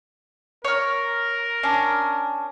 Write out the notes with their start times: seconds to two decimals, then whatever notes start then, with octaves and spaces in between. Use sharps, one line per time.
0.64 A#4 C#5 F6
1.63 C#4 D4